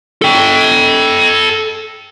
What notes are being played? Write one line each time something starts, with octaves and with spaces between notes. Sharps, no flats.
A4 G5